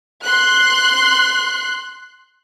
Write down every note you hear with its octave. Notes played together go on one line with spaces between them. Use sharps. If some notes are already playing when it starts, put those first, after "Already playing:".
C6 F#6